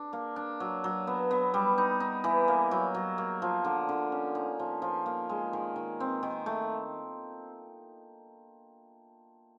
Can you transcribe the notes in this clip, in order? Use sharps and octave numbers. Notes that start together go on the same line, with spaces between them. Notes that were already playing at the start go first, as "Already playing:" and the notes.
Already playing: D4
A#3
D4
F#3
F#3
B3
B3
G3
D#4
D#4
E3
A#3
F#3
F#3
A#3
F3
D3
D3
C#4
D#4
F3
F3
A#3
G#3
D#3
D#3
C4
D#3
A3